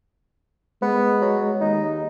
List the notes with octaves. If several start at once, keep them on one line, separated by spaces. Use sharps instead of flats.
G#3 B3
F#3
D#2 D#4